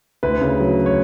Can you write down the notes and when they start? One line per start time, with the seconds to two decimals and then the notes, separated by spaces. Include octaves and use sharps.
0.23 D2 B4
0.41 C#3
0.60 F#3
0.86 C#5